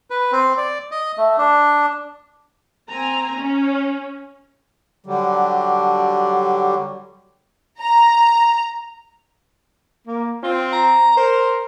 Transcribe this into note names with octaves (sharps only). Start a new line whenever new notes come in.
B4
C4
D5
D#5
A3
D4
C4 G#5 A#5
C#4
D3 F#3 G3
A#5
A#3
C4 F4
A#5
A#4 C5